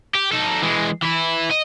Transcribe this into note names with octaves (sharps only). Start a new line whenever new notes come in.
G4
D#4 A4
E3 G#3
E3 E4
D#5